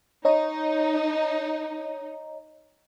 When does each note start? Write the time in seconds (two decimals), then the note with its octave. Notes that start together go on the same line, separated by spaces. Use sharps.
0.25 D#4 C#5 D#5 A#5